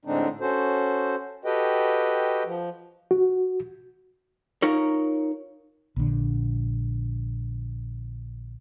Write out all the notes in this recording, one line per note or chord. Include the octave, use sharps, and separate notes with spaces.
A2 D3 G#3 C4 D4 D#4
C#4 F#4 A4 C5
F#4 G4 A4 B4 D#5 G5
F3
F#4
D#4 F4 A#4 C#5
A#1 D3